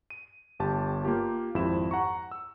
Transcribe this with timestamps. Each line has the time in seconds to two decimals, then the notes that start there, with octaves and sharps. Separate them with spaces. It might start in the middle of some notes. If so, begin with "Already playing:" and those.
0.10 D#7
0.59 G1 G4 A5
1.05 A#3 F4 G4
1.54 G#1 F2 E4 G4 C5 E7
1.91 F#5 A#5 C#6
2.31 E6